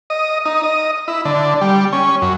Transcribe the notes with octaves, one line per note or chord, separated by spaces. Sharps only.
D#5
D#4
D#5
E4
D3
G3
C#4
F#2